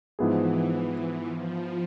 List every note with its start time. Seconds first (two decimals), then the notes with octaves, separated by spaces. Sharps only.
0.19 G#2 E3 F3 B3 E4 G#4
1.23 F3